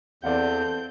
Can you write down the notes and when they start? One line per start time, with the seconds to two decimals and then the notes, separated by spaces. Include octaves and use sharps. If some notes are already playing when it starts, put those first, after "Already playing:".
0.23 E2 C4 A4 D5 F5 F#5 G6